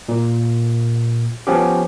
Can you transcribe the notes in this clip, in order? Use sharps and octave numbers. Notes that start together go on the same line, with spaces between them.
A#2
F3 B3 C#4 G4